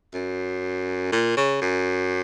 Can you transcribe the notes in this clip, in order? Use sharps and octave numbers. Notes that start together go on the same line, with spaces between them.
F#2
A#2
C#3
F#2